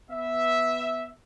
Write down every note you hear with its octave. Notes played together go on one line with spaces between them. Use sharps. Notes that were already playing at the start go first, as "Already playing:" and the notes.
B3 E5